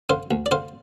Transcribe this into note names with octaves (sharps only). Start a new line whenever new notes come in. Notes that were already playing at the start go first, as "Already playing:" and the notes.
D3 C5 F5
D2
D5
D3 C5 F5